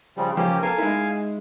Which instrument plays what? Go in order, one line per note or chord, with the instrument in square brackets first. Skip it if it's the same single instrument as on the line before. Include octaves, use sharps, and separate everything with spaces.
[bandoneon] C#3 F3 G3
[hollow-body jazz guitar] C#2 F3 [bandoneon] A#3 C#4 G4
[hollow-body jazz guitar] A4 A#4 [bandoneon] F5 G#5
[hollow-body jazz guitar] G#3 D#4 E4